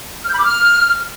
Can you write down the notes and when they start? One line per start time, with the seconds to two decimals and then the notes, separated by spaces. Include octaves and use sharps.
0.23 F6
0.28 G6
0.33 B5
0.38 D6
0.43 F6